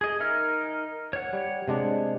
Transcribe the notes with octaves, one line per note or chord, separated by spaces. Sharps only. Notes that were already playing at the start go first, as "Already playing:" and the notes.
G#4 D#5
D#4 A#4 E5 F6
C#5 F#5
G3
C3 G#3 D4